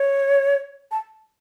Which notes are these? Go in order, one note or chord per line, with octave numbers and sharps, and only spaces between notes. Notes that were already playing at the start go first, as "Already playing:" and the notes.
Already playing: C#5
A5